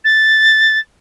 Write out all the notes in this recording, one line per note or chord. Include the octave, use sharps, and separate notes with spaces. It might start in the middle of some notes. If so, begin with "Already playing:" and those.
A6